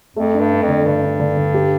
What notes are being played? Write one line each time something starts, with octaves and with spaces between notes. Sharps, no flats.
F2 A3
D4
G2
D4
F2
D3
G2 D3
D4
D3
D3
G4